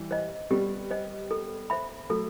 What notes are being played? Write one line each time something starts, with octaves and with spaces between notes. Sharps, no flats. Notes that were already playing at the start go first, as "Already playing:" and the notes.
Already playing: E3 G3
C5 D#5
G3 B3 G4
C5 D#5
A4
C5 E5 B5
F#3 A3 A4